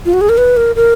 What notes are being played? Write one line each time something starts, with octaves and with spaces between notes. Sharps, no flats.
F4
F#4
G#4
A#4
B4
A#4
A#4